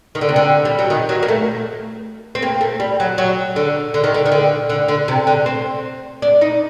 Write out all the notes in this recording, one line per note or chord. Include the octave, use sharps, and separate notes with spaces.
D#3
D3
C3
D3
G3
F#3
D#3
F#3
A#3
A3
C4
A#3
A3
G3
F#3
F#3
D3
D3
D#3
D3
D#3
D3
D3
D3
C3
D3
C4
D4
D#4